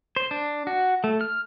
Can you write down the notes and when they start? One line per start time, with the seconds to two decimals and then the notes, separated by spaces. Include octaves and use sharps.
0.16 C5
0.31 D4
0.67 F#4
1.04 A3
1.21 F6